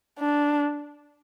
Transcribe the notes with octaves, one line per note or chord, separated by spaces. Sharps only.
D4